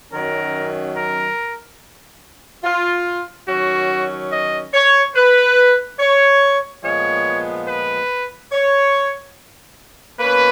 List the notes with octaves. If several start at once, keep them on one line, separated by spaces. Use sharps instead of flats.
F#2 D#3 F#3 C#4 A#4
A#4
F4
D#3 F#3 C#4 F#4
D#5
C#5
B4
C#5
A#2 F3 G#3 B3 C#5
B4
C#5
B2 A#3 C#4 B4